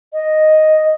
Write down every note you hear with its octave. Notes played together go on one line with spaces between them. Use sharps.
D#5